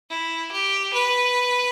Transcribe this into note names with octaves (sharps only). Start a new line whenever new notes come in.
E4
G4
B4